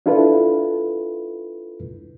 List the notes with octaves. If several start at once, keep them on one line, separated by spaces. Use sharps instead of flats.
D4 E4 F4 A4 B4